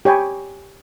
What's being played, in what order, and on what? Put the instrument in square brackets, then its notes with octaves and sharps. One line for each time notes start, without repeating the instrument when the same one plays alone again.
[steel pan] G4 C#5 G5 G#5 B5